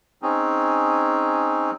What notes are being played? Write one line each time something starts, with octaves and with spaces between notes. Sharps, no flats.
C4 C#4 D#4 G#4